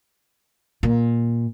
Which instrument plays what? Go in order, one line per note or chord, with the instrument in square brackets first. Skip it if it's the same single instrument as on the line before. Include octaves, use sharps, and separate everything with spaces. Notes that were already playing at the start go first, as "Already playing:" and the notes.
[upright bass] A#2